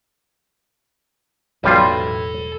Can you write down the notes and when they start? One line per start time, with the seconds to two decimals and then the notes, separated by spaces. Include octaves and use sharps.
1.64 E1 B1 F#3 G3 F4 A4 B5